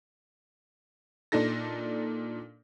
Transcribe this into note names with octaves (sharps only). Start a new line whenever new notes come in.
A#2 D4 D#4 A4 A#6